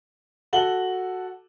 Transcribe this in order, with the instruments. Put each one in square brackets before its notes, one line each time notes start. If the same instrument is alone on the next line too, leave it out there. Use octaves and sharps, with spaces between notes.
[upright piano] F#4 A4 F#7 G7